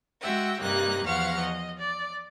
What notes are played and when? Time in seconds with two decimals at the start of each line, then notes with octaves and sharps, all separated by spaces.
0.21 G#3 F#4 E5 F#5 G5
0.59 G2 C3 G3 A#3 D#4 F#6
1.05 E2 F3 F5 F#5 C#6 F6
1.41 D#5
1.80 D5